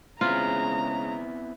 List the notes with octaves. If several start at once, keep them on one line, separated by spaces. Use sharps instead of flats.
C#3 G#3 B3 C4 E4 F4 A#5